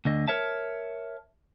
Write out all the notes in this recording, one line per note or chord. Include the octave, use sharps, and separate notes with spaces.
D2 D3 D#5
A#4 C#5 E5 A5